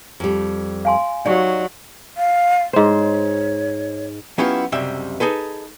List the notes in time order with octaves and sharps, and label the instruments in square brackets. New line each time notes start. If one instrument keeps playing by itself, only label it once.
[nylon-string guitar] F2 G3
[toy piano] F5 G#5 C6
[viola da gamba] F#3 [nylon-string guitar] D#4 [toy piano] G4 D5
[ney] F5
[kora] G#2 C5 [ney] C#5
[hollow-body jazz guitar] F#3 B3 C#4 E4 F4 G4
C#2 F#2 C3 G3 E5
D#4 G#4 A4 B4